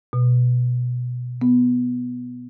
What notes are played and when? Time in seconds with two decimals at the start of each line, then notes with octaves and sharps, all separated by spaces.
0.13 B2
1.42 B3